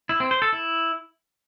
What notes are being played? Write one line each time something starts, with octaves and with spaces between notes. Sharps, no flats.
E4
C4
C5
A4
E4